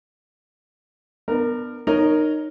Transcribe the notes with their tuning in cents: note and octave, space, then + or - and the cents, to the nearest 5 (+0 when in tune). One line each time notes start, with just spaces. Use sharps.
B3 +0 D4 +30 A#4 -10
D#4 -20 A#4 +0 C#5 +0